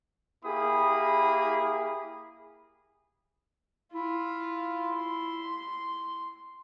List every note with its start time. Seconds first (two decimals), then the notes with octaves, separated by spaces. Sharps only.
0.44 A#3 E4 G4 G#4 B5 D#6
3.94 E4 F4
4.95 C6